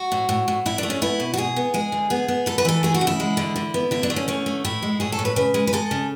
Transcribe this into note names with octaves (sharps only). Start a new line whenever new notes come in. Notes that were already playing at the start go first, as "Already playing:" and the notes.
Already playing: F#4
A2
A2
A2
A2 E4
A3 D4
C#4
B3 E4
B2
F#4
B2 G#4
B3
G#3 G#4
D3
B3 G#4
B3
E3 A4
B4
E3 A4
A3 G#4
F#4
C#3
E4
G#3
D3
D3
B3
D3 E4
D4
A3
C#4
D3 C#4
A3
A2 E4
G#3
A2 G#4
A4
A2
B4
C#3 B4
G#3
B4
G#3 A4
C#3